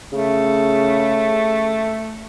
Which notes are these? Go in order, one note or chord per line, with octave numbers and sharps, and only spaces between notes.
C#3 A3